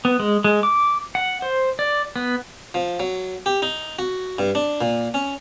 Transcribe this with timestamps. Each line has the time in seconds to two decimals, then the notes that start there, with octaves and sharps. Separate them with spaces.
0.05 B3
0.20 G#3
0.44 G#3
0.63 D6
1.15 F#5
1.42 C5
1.79 D5
2.16 B3
2.74 F3
3.00 F#3
3.46 G4
3.62 D#4
3.99 F#4
4.39 G2
4.55 D4
4.81 A#2
5.14 C#4